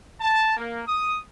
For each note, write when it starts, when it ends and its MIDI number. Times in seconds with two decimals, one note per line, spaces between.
0.21 0.56 81
0.57 0.84 58
0.88 1.22 87